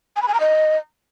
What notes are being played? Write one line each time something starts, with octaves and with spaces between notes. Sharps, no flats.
G#5
B5
G#5
A#5
D#5